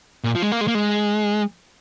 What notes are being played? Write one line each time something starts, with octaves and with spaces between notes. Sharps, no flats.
A#2
F3
G#3
A#3
G#3
A#3
G#3